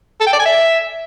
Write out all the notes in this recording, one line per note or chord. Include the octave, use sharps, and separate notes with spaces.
A4
G5
D5
G#5
E5